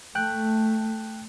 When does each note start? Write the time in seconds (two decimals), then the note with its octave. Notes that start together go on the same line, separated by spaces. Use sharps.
0.15 A3 G5 F#6